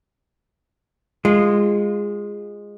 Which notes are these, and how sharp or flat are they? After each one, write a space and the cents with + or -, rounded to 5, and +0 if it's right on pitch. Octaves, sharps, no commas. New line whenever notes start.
G#3 -15 F4 +0